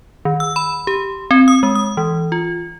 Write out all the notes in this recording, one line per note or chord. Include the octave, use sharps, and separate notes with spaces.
D#3
E6
B5
G4
C4
D#6
G#3
D#6
E3
F4